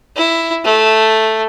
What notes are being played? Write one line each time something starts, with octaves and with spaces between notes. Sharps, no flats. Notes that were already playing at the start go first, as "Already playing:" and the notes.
E4
A3